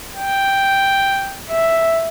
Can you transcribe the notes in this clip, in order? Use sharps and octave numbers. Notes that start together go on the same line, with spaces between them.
G5
E5